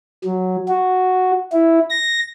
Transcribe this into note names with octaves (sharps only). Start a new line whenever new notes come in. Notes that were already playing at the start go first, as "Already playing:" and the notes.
F#3
F#4
E4
A#6